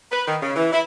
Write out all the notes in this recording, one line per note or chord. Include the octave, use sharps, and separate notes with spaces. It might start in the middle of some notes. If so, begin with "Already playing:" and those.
B4
D#3
C#3
E3
E4